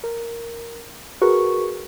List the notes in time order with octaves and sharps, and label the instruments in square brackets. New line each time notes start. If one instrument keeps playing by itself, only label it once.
[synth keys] A#4
F#4 G#4 A#4 B4 C#6